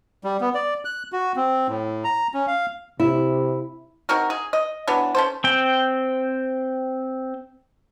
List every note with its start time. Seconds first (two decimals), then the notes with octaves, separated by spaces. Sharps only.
0.24 G3
0.41 B3
0.55 D5
0.85 F#6
1.12 F#4
1.36 C4
1.68 A2
2.04 A#5
2.34 C#4
2.47 F5
3.00 C3 E4
4.09 C4 D#4 F#4 A#4
4.30 G#4
4.53 D#5
4.88 E3 F#3 B3 D4
5.15 C#4 A4 C5
5.44 C4 G5